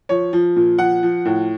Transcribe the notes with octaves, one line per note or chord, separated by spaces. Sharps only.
F3 C#5
F3
A#2
F3 F#5
F3
A2